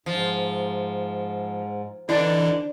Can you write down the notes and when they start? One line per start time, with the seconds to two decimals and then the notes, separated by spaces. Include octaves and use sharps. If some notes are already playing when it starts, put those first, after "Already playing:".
0.06 G#2 F3
2.09 D3 E3 D4 D#4